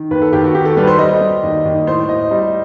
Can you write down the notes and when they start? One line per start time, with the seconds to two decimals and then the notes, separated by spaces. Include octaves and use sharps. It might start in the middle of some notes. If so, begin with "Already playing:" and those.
Already playing: D#3
0.11 D#2 B4
0.22 A4
0.33 D#2 G4
0.44 F#4
0.55 D#3 G4
0.65 A4
0.77 G3 B4
0.87 C5
0.99 G3 D#5
1.20 G3
1.43 D#2
1.65 D#2
1.87 A2 C5
2.09 A2 D#5
2.31 G3 D#5